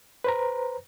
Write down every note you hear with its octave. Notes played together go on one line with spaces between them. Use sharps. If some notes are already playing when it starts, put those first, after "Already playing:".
B4 C5 A#5